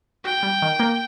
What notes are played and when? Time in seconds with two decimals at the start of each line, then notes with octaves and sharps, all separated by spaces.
0.25 F#4 G5
0.43 G3
0.62 D#3
0.80 A#3